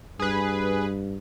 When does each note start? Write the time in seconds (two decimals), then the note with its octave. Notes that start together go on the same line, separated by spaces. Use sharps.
0.19 G2 G#4 B4